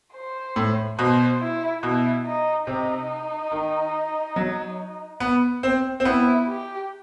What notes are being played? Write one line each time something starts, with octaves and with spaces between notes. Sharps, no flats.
C5
A2
B2 C5
E4
B2 E4
D#4
C3 D#4
D#3
F#3
B3
C4
C4
B3 E4
G4